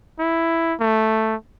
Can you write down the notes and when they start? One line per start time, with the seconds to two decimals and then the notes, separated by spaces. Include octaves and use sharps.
0.19 E4
0.80 A3